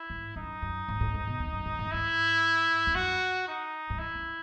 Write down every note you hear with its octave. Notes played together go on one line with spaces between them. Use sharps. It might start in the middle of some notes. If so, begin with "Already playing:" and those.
Already playing: E4
G#2
F#2 D#4
F#2
G#2
A2
G#2
B2
E2
F#2
G#2
G#2
F#2
G#2 E4
E2
F#2 F#4
D#4
G#2
F#2 E4
F#2